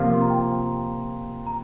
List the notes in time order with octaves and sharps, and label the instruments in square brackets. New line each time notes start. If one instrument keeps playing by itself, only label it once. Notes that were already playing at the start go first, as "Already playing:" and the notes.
Already playing: [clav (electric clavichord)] C3 F3 A#3 F4 [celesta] F5
[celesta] C6
A#5
G5
A#5